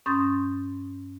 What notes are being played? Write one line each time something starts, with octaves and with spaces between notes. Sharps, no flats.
G2 C#4 C6 D#6 G6 A6